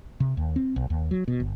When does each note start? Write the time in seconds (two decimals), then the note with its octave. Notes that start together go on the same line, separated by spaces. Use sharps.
0.20 C3
0.37 D#2
0.56 C4
0.76 B1
0.90 D#2
1.11 F#3
1.28 B2
1.40 G1